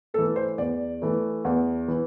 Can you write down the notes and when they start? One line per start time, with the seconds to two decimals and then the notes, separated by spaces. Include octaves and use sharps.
0.14 A3 A4
0.18 E3
0.36 C5
0.58 E2 D5
1.02 E3 A3
1.45 E2
1.88 E3